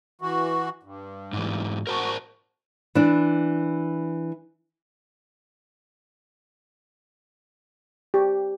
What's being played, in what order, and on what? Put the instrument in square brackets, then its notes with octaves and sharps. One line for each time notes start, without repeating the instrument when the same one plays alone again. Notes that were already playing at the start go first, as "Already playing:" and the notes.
[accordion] E3 F#4
G2
[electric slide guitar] G#2 E3
[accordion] F#4 [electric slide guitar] A#4 C5 A5
[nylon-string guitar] E3 D4
[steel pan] G4